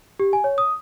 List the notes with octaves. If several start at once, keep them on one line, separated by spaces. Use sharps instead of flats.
G4
G#5
C#5
D#6